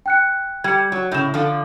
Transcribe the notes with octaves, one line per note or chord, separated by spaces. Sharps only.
G5 F#6 C#7
G3 G#6 C#7
F#3
A2 C#3 G6 E7
D3 F3